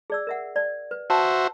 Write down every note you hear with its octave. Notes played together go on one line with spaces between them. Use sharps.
G#4 D5 E6
A#4 E5 F#5
D5
B4
F#4 C5 E5 A5